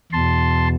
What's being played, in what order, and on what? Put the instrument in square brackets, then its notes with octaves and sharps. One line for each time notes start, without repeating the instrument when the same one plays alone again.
[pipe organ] E2 B2 A5 C6